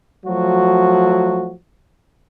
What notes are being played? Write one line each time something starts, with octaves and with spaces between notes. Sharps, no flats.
F3 F#3 A3 F#4